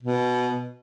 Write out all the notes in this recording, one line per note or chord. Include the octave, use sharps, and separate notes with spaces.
B2